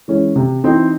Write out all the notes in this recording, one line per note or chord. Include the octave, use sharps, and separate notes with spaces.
E3 G#3 C#4
C3
E3 C4 D#4